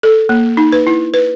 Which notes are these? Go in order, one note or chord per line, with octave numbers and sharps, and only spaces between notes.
A4
A#3
D#4
B4
E4
B4